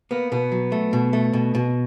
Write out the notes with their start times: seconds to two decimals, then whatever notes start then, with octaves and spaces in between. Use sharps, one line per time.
0.11 A#3 B3
0.32 B2 B3
0.52 F#3
0.72 A3
0.93 B2
1.13 A3
1.33 B2
1.55 B2